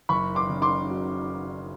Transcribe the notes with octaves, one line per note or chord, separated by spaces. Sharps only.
F#1 B5 C#6
C6 D6
C#3
C6 D6
F#3